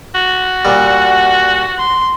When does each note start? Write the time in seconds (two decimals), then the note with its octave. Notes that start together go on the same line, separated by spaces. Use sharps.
0.14 F#4
0.65 A#2 G3 F#5
1.78 C6